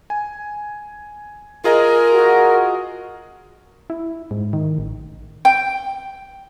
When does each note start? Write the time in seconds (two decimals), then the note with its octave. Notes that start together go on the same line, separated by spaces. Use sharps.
0.10 G#5
1.64 F4 G#4 A#4 D#5
2.13 F#4
3.90 E4
4.31 G#2
4.53 D#3
4.78 A1
5.45 G5